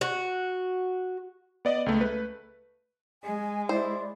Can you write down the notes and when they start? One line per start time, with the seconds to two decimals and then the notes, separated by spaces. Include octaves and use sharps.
0.01 F#4
1.65 B3 D5 D#5
1.86 C#2 A3
2.01 A3 B4
3.23 G#3 G#5
3.69 E4 C5 D5